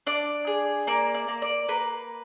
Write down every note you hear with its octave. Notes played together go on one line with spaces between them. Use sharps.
D4 D5
G#4
A#3 D5
D5
A#3
D5
A#3 B4